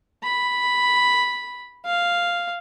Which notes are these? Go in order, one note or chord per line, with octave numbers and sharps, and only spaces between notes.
B5
F5